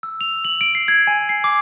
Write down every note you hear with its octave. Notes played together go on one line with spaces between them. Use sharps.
E6
F7
F#7
D7
C7
G#6
G#5
C7
D6